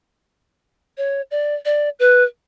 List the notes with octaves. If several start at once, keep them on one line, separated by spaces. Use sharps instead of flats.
C#5
D5
D5
B4